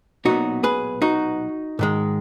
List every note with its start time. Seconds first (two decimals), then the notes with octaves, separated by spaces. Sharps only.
0.25 B1 A#2 F#3 B3 D#4 F#4
0.63 G#4 B4
1.02 D#4 F#4
1.79 G#2 D#3 G#3